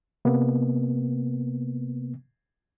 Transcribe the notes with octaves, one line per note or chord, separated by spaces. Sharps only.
C3 A#3 B3